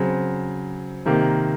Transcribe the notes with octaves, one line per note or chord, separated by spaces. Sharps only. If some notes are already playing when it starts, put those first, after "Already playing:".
Already playing: C#3 F#3 C4
C3 D#3 A#3